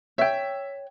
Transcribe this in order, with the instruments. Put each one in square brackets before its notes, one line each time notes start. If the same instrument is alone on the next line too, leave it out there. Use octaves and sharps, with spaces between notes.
[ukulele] C#5 G5 [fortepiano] E5